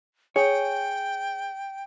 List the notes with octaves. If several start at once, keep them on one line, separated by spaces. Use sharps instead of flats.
G#4 C#5 G5